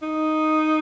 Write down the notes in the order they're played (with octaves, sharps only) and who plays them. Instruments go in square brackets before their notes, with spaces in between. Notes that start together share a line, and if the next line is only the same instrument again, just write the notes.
[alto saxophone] D#4